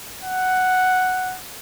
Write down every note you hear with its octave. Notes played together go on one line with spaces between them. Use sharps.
F#5